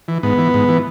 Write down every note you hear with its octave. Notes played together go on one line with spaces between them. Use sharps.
E3
G#2 B3
E3
G#2
E3